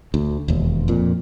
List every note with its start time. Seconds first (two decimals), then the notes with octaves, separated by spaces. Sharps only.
0.14 D2
0.48 E1 D#2
0.88 F2 A#2